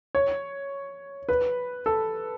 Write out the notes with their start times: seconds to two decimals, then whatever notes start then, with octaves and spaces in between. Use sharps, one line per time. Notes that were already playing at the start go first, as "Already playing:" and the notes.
0.15 C#5
1.29 B4
1.86 A4